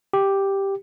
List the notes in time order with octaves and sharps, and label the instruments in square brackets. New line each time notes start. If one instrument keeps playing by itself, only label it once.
[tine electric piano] G4